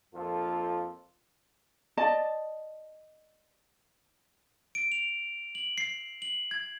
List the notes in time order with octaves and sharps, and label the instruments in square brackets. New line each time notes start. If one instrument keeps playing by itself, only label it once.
[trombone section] A#1 F2 A#3 F4 A4
[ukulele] D5 D#5 A5
[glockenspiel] D7
F7
F#7
C7
F#7
G#6